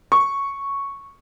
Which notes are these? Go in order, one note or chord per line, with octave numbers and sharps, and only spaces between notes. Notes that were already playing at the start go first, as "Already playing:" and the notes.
C#6